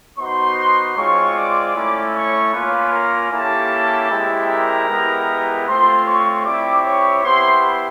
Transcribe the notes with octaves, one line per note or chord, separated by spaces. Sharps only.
B3 D#4 F#4 C5 C6
G#3 C4 F4 C#5 C#6
D5 D6
A3 C#4 E4
C#5 C#6
A#3 C#4 F4 B4 B5
A#4 A#5
A#3 C#4 E4 G4 A4 A5
G#3 C4 E4 G4
A#4 A#5
G#3 B3 E4 G4
A3 C4 F4 C5 C6
C#5 C#6
C4 E4 G4 D5 D6
C#5 C#6
B3 E4 G4 C5 C6